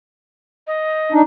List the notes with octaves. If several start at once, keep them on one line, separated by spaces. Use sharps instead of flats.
D#5
D4 D#4